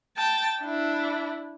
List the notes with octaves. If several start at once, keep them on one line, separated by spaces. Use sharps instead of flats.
G5 A5
D4 E4